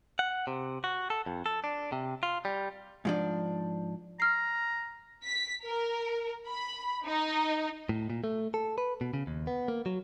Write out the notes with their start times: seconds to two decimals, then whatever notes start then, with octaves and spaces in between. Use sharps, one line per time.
0.19 F#5
0.47 C3
0.84 F#4
1.10 A4
1.26 F2
1.46 A4
1.64 D4
1.92 C3
2.23 F4
2.45 G3
3.05 G#2 F3 D4
4.20 A#5 F6 C7
5.24 B6
5.64 A#4
6.47 B5
7.05 D#4
7.89 A2
8.10 A#2
8.24 A3
8.54 A4
8.78 B4
9.01 B2
9.14 C#3
9.27 D#2
9.47 B3
9.68 A#3
9.86 F#3